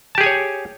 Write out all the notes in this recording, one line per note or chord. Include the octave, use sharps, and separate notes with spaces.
G4 G#4 C#5 G#5 A5